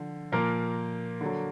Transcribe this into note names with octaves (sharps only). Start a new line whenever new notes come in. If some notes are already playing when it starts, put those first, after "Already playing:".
Already playing: D3 F3
A#2 F3 A#3 A#4
D3 F#3